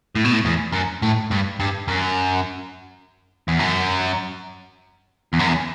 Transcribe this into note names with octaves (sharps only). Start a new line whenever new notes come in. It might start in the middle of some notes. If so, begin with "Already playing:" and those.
A2
B2
A2
E2
F#2
A2
G2
G2
F#2
E2
F#2
E2
F#2
E2